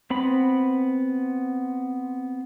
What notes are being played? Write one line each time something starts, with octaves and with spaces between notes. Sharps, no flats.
B3 C4 B5